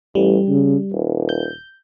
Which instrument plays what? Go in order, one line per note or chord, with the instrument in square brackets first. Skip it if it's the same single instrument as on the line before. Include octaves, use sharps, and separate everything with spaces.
[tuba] A1 [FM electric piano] G3
[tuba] C#3
D#1
[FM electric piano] G6